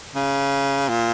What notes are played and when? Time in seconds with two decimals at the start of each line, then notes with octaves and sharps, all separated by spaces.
0.15 C#3
0.89 A#2